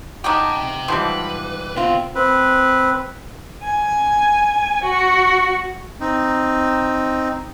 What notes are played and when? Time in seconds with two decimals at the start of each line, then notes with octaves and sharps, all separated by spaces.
0.24 D#4 F#4 G4 G5 A5
0.53 C3 G5
0.88 G#2 D3 E3 F3 G3 B4 C5
1.76 B2 C4 F4
2.15 C4 B4
3.64 G#5
4.83 F#4
6.00 C4 D#4